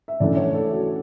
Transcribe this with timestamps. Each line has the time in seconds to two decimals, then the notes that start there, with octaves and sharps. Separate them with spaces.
0.08 E5
0.20 C#3 E3 A3 D4 D5
0.37 C#5
0.54 A4
0.70 F#4